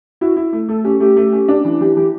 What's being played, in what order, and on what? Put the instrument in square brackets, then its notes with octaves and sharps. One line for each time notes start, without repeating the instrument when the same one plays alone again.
[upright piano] E4 [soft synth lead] F#4
[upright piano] E4
A3
[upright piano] A3 [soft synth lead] A4
[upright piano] C#4 [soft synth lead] G4
[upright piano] A3 [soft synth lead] G4
[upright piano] A3
C#4
D4
E3
[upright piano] E3 [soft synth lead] G4
[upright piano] E3 [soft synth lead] G4